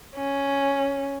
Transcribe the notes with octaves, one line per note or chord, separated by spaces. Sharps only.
C#4